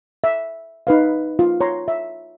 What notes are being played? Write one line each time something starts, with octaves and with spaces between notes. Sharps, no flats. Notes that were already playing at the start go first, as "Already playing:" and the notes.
E5
D#4 B4 F5
F4
C#5 A#5 C6
E5